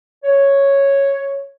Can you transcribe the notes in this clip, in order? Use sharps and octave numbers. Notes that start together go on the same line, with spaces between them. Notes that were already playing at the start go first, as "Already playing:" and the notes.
C#5